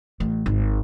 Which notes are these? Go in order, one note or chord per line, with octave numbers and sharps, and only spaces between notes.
A1
G#1